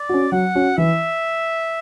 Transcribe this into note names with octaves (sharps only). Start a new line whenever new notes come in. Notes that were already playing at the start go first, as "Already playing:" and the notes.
Already playing: D5
C#4 F#4
F#3 F#5
C#4 F#4
E3 E5